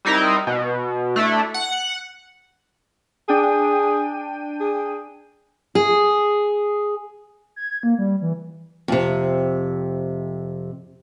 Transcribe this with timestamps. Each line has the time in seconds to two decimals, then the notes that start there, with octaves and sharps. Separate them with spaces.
0.05 G3 C4 D#4 E4 A#4
0.47 B2
1.16 A3 D4 E4
1.54 F#5
3.28 D4 G#4 G5 D#7
4.60 G#4
5.75 G#4
7.56 G#6
7.83 A#3
7.98 G3
8.21 E3
8.88 F2 C3